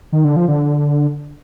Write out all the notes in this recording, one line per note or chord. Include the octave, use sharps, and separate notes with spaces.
D#3
D3
F3
D3